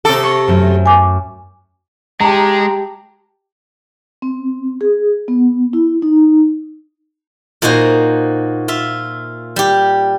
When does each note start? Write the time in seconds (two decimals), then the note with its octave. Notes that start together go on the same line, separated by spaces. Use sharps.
0.05 C3 A4 D6
0.23 C#6
0.48 F#2 A3
0.86 G#5 D6
2.21 G#3 G4 A5 A#5
4.22 C4
4.81 G#4
5.28 B3
5.73 E4
6.02 D#4
7.62 A#2 A#3 D#4 F#4 C5
8.68 F4 E5
9.56 G3 G4